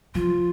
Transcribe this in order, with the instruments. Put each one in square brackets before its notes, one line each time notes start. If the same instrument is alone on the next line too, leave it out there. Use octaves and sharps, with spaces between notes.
[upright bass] F3 [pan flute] F4